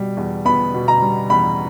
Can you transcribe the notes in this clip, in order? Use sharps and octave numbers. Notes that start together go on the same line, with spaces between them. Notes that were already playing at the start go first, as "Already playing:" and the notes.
Already playing: B2 G3
E2
B3 B5
B2
A#5
G3
E2 B5